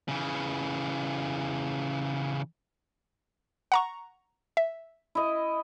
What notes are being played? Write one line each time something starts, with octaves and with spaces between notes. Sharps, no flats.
C#3 E3
F#5 A#5 C#6
E5
E4 D#5